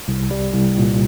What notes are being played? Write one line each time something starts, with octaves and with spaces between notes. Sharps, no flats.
C2
G3
C2
A#2